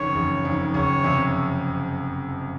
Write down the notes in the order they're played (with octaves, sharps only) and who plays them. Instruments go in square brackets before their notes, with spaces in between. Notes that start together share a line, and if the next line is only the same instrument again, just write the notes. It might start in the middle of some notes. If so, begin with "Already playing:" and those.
Already playing: [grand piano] F#1 F2 D#3 [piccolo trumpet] C#5
[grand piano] F#1
F2 D#3
[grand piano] F#1 [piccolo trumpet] C#5
[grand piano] F2 C3